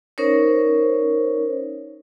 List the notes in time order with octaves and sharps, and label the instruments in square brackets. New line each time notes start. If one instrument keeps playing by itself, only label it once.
[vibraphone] C#4 D#4 A#4 C5 C#5